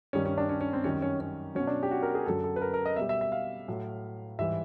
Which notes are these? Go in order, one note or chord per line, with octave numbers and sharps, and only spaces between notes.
G2 D#3 G3 C#4
C#4
D4
C#4
C#4
C4
F#2 D#3 G3 C#4
C#4
C#4
B2 F#3 C#4
D4
G4
F#4
A#4
G#4
F#2 D3 F#3 A4
A4
B4
A#4
A#4
D#5
B2 G3 E5
E5
E5
F5
A2 F#3
G#2 E3 G3 E5